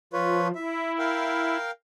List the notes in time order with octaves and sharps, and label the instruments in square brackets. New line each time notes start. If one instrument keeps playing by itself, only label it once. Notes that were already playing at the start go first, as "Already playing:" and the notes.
[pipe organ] F3 [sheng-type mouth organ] F4 B4 C#5
[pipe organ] E4 [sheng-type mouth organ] E5
[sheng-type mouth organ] A#4 F5 G5